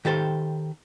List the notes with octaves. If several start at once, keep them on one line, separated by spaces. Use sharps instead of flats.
D#3 G4 A4 C5